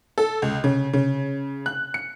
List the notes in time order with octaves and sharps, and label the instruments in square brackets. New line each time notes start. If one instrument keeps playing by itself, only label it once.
[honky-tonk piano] A4
C#2
C#3
C#3
F#6
C#7